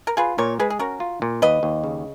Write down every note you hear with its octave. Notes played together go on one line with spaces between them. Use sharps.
A#4
F4 G#4 B4
A#2 A#4 C#5
G#3 G#4 B4
G#4
C#4 F#4 A#4
F4
A#2
D#2 B4 D#5
D#2
C#3